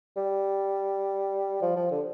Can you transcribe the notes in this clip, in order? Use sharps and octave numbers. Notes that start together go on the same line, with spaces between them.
G3
F3
F3
D3